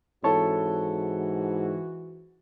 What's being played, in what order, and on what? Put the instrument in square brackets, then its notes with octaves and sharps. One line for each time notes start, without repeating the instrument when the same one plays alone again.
[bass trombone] G#2 [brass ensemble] E3 F#4 [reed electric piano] C4 C#5 A5 [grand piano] E4 A4